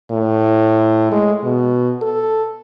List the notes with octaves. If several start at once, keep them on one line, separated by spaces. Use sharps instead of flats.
A2
G#3
B2
A4